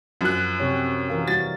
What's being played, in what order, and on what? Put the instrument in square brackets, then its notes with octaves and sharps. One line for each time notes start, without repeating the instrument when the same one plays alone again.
[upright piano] F#2 F#6 [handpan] F3
[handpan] C3 G4 C#5
E3 A#4 F5
[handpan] G3 F#4 [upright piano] A6